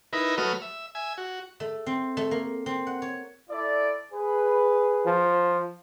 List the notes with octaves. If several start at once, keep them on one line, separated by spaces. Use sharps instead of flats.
D#4 E4 A#4 B4
F#3 A3 B4 D#6 F6
E5
E5 G#5
F#4
A3
C4
A3
A#3
C4
F#5
C#5
E4 A4 D5
G#4 B4
F3